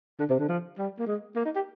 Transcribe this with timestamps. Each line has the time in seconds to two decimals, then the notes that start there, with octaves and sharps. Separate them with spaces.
0.19 D3
0.29 C3
0.39 D3
0.49 F3
0.78 G3
0.99 A#3
1.07 G#3
1.36 A#3
1.45 D#4
1.55 G4